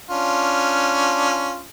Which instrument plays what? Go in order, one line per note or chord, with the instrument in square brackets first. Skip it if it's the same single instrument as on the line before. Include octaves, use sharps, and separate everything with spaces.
[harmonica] C#4 D4 F4